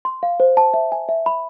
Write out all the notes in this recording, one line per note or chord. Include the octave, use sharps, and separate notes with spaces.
C6
F5
C5
A5
E5
G#5
E5
B5